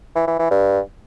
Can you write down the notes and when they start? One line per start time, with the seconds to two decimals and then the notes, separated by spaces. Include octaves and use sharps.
0.16 E3
0.27 E3
0.39 E3
0.51 G2